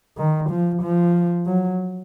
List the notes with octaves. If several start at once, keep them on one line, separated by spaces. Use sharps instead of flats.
D#3
F3
F3
F#3